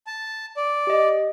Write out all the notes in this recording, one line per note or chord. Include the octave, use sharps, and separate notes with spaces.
A5
D5
G4 D#5